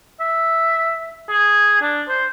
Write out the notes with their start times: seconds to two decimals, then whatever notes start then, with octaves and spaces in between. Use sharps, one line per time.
0.20 E5
1.29 G#4
1.81 D4
2.09 C5